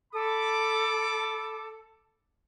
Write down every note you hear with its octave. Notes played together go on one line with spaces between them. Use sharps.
A4 B5 D6